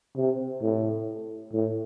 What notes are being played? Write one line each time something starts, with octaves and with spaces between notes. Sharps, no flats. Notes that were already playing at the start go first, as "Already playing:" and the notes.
C3
A2
A2